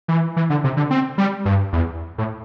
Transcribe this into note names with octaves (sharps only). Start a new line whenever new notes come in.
E3
E3
D3
C3
D3
C4
G3
G2
E2
A2